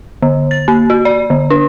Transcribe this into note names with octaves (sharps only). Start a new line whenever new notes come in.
D3
A6
A#3
F#4
D5
D3
D4